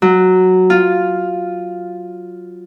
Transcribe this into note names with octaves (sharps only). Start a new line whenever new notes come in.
F#3
F4